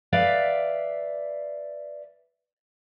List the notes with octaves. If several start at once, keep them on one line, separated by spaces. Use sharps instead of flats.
B4 D5 E5 F5